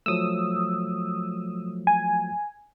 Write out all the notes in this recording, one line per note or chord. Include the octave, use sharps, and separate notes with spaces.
F3 F#3 A3 D#6 E6
G#5